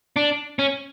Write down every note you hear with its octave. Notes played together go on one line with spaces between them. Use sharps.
D4
C#4